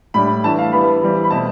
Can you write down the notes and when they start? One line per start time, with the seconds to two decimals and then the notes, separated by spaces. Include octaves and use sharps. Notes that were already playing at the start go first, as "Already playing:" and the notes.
0.14 A2 G3 D4 B5
0.44 E3 A3 D4 A5
0.59 F5
0.72 E3 G3 B3 B5
1.03 E3 G3 C4
1.24 B5
1.30 B2 A3 C4 A5